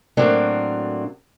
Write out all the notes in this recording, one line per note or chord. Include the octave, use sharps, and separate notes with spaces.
A2 F#3 A3 A#3 C4 D4